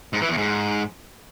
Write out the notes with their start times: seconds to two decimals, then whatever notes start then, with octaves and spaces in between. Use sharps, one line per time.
0.13 G#2
0.21 E3
0.29 E2
0.37 G#2